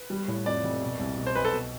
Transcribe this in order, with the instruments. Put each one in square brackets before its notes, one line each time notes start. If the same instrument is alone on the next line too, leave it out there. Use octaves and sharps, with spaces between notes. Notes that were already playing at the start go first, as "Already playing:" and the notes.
Already playing: [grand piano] B4
[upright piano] G3
A2
[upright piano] F2 [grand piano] D5
[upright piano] F1
B2
C2
B2
[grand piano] C5
[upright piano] B1 [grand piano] B4
[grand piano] A4
[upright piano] B2